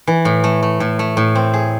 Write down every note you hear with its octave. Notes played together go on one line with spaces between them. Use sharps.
E3
A2
A3
A3
A2
A3
A2
C4
G#4